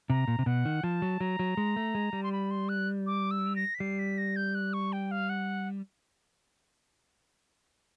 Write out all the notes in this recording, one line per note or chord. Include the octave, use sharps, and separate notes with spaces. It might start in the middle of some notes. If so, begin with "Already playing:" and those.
C3 A#5
A#2
C3
B2 F#5
D#3
F3 A5
F#3
F#3 A#5
F#3
G#3
A3
G#3
G3
C6
B5
C6
F#6
D6
E6
A#6
B6
G3 C7
B6
A#6
G6
F#6
C#6
G5
F5
F#5